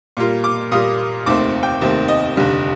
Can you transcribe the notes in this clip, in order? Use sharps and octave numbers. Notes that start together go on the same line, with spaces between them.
A#2 G3 A#3 F4
D6
A#2 G3 A#3 F4 D#6
F1 D#2 D#3 A3 C4 D6
G5
F1 D#2 D#3 A3 C4
D#5
F1 D#2 D3 G3